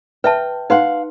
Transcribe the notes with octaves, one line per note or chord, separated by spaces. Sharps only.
B4 E5 G5 A5
D#4 B4 F5 F#5 C6